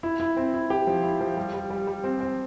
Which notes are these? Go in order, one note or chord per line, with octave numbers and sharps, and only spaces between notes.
E4
E4
C4
E4
G4
F3
E4
F3
G3
G3
G3
G3
C4
C4